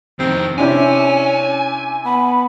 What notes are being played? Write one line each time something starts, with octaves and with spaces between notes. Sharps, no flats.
F2 D#3 C4
C3 C#4 D4 E4 G#5
B3 B5